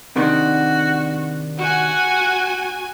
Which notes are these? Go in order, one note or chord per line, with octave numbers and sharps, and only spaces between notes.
C3 D#3 D4 F#4
F#4 F#5 G#5